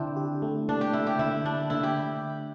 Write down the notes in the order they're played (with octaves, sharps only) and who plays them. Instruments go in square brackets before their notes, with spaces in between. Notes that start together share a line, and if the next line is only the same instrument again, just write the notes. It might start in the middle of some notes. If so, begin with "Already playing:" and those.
Already playing: [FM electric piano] D3 E4 [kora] C4 D4
[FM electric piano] G4
A3
[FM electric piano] A3 [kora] D4
[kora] G4
[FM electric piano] A3 [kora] E4
[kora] G4
[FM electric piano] D3 [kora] E4
[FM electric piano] D3 [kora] D4
[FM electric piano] D3 [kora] E4
[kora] G4